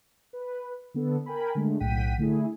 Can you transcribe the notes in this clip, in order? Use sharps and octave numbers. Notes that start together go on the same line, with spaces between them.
B4
D3 B3 A4
A#4 G5 G#5 B5
D3 G#3 A3
B1 A2 F#5 G5 B6 D#7
D3 A3 E4 G#4